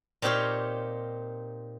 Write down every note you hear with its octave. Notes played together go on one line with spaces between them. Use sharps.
A#2 C4 D#4 G4 C#5 F5